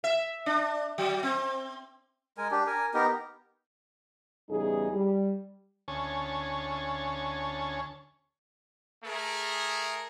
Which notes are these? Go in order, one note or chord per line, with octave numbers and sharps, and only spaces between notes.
E5
D4
F#3
C4
G#3 A#4 G#5
D4 G4
A#4 G#5
B3 D#4 G4 A#4
E2 C#3 G3 D#4 G#4
G3
D2 C#4 C#5 G#5 A5
A3 G#4 A#4